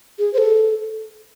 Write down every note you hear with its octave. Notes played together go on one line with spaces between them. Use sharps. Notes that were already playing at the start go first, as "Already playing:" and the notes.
G#4
C5
A4